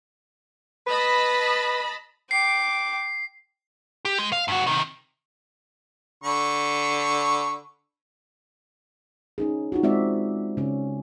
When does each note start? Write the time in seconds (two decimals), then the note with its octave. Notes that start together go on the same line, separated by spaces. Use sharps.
0.87 B4 D#5 A5 B5
2.31 G5 D6 C7
4.05 G4
4.19 G#3
4.32 F5
4.48 G2 F#4
4.66 C3 D#3
6.24 D3 B5 C#6
9.38 C#4 D#4 G#4
9.72 D#4 F4 F#4
9.83 G#3 C4 D5 E5
10.57 C#3 C#4